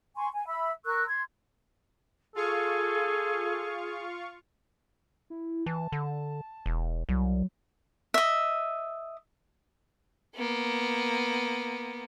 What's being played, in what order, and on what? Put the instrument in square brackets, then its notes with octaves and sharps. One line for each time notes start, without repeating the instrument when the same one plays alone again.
[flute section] G#5 C6 C#6
G#5
E5 B5 E6
A#4 C#6 E6 F#6
C6 G#6
[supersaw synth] F4 F5 C#6 [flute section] G#4 G#5 [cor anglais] A4
[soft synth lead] E4
[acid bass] E3 [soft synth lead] A5
[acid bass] D3
E1
[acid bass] C2 [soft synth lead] F#3
[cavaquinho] D#5 E5
[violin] A#3 B3